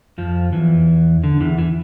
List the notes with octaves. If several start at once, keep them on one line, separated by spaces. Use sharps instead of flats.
F2 F3
E2 E3
D3
E2 E3
E3